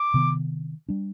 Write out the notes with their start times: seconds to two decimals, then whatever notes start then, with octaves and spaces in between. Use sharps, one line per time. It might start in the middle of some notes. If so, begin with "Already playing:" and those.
Already playing: D6
0.14 C3 D#3 B3
0.89 G3 D4